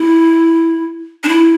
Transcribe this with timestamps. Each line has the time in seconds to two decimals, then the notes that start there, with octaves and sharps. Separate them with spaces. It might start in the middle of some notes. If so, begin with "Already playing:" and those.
Already playing: E4
1.24 D4
1.28 E4